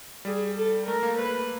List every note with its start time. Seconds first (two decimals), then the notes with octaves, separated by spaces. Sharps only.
0.25 G3 G#4
0.56 A4
0.87 A3 A#4
1.03 A#3
1.18 A3 B4